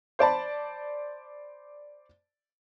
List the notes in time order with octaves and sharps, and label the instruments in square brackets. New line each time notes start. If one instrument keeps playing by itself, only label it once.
[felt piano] C5 D5 A5 B5